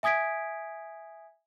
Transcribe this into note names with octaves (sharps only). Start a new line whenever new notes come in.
E5 G#5 D#6 G#6 B6 D7